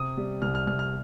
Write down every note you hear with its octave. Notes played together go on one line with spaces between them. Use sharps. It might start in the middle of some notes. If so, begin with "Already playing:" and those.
Already playing: C3 D#6
G3
C2 F6
F6
C2 F6
F6